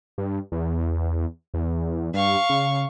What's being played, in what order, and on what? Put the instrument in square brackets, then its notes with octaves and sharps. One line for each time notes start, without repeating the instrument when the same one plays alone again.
[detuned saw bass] G2
E2
E2
[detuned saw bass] G2 [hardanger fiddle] F5 C#6
[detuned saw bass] C#3